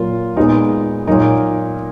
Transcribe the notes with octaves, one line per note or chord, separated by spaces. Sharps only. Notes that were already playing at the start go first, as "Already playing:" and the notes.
Already playing: A#2 F#3 A#3 F4
A#2 G#3 B3 D#4
A#2 F#3 A#3 D#4